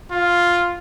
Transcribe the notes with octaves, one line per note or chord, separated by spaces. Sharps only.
F4